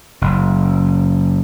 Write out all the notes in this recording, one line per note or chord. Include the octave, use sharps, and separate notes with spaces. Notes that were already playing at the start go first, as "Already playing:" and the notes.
F#1